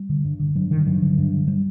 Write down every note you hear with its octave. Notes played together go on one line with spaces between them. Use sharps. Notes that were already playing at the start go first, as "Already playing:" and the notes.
Already playing: G3
D3
G2
D3
G2 F#3
D3 D#3
G2 F#3
D3
G2
D3
G3